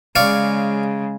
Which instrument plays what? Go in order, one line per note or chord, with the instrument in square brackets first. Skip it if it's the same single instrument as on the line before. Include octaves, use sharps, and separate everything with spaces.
[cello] C#3 G#3 [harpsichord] C#5 D5 F5